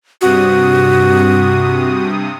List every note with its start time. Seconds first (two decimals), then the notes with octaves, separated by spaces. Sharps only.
0.21 G2 C3 F#4 D#6